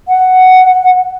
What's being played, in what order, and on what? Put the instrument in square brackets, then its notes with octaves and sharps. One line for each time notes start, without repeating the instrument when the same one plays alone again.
[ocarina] F#5